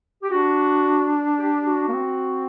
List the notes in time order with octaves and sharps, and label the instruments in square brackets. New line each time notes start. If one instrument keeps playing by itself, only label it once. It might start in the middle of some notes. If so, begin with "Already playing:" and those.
[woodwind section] G4
[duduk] D4 [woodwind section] F#4
[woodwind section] G4
F#4
[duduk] A#3
C4